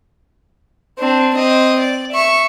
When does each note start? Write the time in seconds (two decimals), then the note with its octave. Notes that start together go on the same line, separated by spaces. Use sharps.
0.99 C4 D4
1.35 C4 D#5
1.80 D5
2.13 E5 C#6